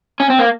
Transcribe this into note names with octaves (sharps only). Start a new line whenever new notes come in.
C#4
C4
A#3